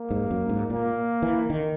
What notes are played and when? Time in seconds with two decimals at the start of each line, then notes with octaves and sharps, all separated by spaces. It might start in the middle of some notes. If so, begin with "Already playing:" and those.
Already playing: A#3
0.11 G#2
0.31 F#2
0.49 G#2
0.70 A#2 A#3
1.22 E3
1.50 D#3